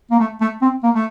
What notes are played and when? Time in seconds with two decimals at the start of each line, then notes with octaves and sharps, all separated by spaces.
0.11 A#3
0.19 A3
0.40 A3
0.61 C4
0.83 A#3
0.94 A3